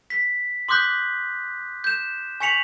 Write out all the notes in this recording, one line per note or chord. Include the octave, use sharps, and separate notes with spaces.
B6
C6 D6 D#6 F#6 G6 B6
G6 E7
G#5 C#6 B6 C#7 F7 F#7